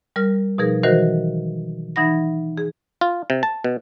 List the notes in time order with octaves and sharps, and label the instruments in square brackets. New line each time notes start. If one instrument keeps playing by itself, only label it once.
[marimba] G3 A#4 F6
B2 F3 D#4 G#4 A#4
D#3 E3 F#3 F#4 A#4 C5
E3 D#4 E5 F#5 B5 A#6
G#4
[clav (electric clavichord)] F4
C3
A5
B2